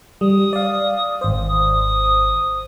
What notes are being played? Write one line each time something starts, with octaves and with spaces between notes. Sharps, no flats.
G3 D#6
D5 F5
G#1 C5 D#6